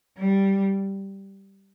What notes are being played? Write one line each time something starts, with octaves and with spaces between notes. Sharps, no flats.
G3